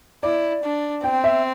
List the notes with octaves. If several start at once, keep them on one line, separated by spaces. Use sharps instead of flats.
E4 D5
D4
C4 G5
E5